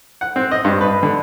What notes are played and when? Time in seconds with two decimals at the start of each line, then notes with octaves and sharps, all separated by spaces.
0.21 F#5
0.36 C4
0.51 D#5
0.65 G2
0.81 B4
1.03 D3